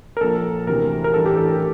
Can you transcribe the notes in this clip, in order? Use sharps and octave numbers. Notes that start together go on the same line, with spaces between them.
A#4
A#1 A#2 A4
D2 C3 E3 A#4
A#4
A1 G2 E3 A4
G4
A4
A#4